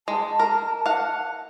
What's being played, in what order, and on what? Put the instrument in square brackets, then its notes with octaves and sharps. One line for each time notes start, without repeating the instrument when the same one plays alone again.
[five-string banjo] G#3 [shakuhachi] A5
[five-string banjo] A#4
F5 F#5